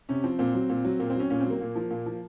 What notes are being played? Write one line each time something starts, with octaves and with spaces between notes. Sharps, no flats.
C3 C#4
F3 C4
A#2 C4
F#3
A#2
F#3
A#2 A#3
C4
F#3 C#4
A#2 C#4
F#3 C4
A#3
A#2
F3
A#2
F3